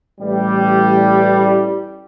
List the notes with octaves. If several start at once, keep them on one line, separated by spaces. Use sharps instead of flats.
A1 G3